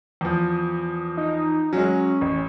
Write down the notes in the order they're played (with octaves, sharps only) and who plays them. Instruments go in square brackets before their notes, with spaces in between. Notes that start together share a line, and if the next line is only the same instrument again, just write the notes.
[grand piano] E2 F3
[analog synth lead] D#4
[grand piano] F#3 G#3 [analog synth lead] C#4
[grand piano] A1